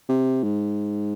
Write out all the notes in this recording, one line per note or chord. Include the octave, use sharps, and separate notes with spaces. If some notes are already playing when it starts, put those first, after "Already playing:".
C3
G#2